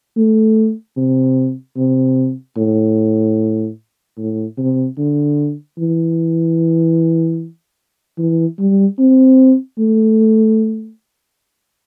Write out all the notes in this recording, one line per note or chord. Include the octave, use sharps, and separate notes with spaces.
A3
C3
C3
A2
A2
C3
D3
E3
E3
G3
C4
A3